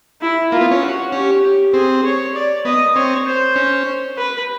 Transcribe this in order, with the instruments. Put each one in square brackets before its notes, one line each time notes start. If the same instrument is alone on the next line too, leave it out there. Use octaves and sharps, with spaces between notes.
[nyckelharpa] E4
[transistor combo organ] A#3 [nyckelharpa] F4
[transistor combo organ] B3
C#4
[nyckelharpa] F#4
[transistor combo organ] C#4 [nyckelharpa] G4
[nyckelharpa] G4
[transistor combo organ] C4 [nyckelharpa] G#4
[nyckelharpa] C#5
D5
[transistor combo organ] B3 [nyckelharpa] D#5
[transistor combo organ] C4 [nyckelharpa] C#5
[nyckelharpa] C5
[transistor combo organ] C#4
[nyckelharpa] B4